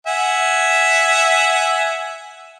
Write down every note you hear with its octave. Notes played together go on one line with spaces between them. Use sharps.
E5 F#5 G#5